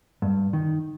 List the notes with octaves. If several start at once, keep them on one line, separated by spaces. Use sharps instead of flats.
G2
D#3